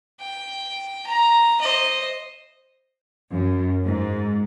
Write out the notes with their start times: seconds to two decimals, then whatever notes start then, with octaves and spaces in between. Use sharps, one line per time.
0.20 G5
1.06 A#5
1.61 C5 D#5
3.31 F#2
3.84 G#2